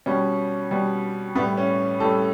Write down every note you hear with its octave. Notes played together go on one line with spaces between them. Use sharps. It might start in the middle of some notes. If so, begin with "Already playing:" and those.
B2 G3 C#4
B2 G3
A2 G3 B3
C#4
A2 G3 A4